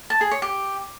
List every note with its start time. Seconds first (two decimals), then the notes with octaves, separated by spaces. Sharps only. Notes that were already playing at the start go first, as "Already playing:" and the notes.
0.10 A5
0.21 G#4
0.31 C#5
0.42 G4